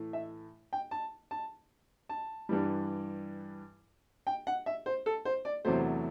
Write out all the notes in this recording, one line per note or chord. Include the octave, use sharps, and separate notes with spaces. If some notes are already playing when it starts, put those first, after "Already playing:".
Already playing: A2 E3 A3
E5
G5
A5
A5
A5
G2 E3 G3
G5
F#5
E5
C5
A4
C5
D5
E2 C3 F#3 A3 C5